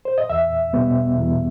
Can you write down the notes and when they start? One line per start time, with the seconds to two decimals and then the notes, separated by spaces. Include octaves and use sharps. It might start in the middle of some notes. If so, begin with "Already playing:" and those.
0.05 C5
0.18 D#5
0.30 E2 E5
0.73 B2 G3 B3
1.17 E2